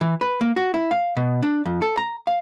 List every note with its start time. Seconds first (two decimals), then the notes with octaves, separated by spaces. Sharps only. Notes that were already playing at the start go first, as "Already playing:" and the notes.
0.01 E3
0.21 B4
0.41 A#3
0.56 F#4
0.74 E4
0.91 F5
1.17 B2
1.42 D4
1.65 F2
1.82 A4
1.97 A#5
2.27 F5